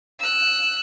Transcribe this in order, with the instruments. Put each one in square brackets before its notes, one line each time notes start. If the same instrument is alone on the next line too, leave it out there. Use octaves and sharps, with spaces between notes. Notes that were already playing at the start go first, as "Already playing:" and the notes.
[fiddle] E6 F#6